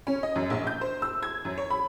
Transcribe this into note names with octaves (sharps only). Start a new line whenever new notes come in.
C#4
D#5
F#2
A#1
G6
C5
E6
G#6
F#2
C#5
B5